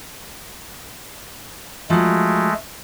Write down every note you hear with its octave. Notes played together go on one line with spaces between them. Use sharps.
F3 F#3 G#3 A3